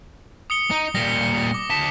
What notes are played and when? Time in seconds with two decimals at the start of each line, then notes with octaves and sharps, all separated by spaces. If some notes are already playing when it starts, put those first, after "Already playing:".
0.50 D#6 C#7 G7
0.71 D#4
0.95 A#2 G3 A#6
1.54 D6
1.70 D2 A5 B6